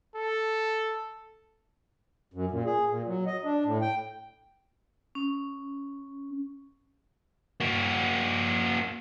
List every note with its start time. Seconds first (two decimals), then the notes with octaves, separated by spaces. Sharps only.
0.16 A4
2.34 F#2
2.51 A#2
2.65 G#4
2.90 A#2
3.07 F#3
3.26 D#5
3.45 D4
3.65 A2
3.81 G5
5.15 C#4
7.60 A#3 F#4